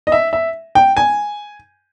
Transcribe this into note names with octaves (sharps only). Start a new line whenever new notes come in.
D#5
E5
E5
G5
G#5